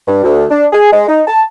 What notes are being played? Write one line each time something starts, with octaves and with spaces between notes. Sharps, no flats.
G2
D2
D4
G#4
G#3
D#4
A5